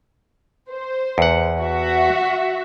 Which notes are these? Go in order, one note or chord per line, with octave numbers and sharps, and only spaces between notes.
C5
E2 F#5
F#4 E5